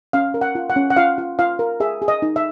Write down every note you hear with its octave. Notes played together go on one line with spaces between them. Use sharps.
C#4 F5
A#4
F#5
F4
F#5
C#4
F#5
F4 F5
F4
F4 F5
A#4
G#4 E5
G#4
D#5
D#4
E5